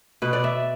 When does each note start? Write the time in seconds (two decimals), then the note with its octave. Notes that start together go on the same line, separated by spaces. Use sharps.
0.22 B2 B4
0.33 D5
0.44 E5